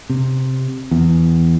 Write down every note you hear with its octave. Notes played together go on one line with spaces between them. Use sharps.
C3
E2